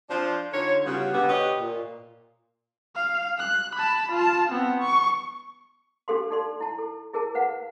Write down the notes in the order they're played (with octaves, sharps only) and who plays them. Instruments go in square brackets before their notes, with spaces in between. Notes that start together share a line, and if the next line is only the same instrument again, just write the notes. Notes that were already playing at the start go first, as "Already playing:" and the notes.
[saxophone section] F3 D4 C5
D3 D#4 F4 C#5
C#3 G3 B3 F4 F#4
B2 D3 G#3 B3 F#4 G4
G4 B4 C#5 D#5
A#2
[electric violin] F5
F#6
A5 B5
F4 A5
B3 C4
C#6
[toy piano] D4 F#4 G4 A4 F5 C6
D#4 G4 A4 D5 C6
E4 A5
A4
E4 G#4 A#4 A5
B4 F5 F#5